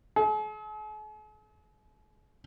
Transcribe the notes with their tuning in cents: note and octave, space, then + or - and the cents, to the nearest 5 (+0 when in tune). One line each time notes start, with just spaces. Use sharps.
G#4 +45